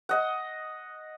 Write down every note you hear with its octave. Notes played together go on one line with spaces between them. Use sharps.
D#5 F#5